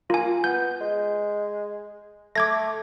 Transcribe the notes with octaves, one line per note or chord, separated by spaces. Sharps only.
A#3 F4 G#5
B3 G6
G#3
A3 D6 G#6 A#6